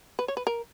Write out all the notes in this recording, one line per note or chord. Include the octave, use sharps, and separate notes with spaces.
B4
C#5
B4
A#4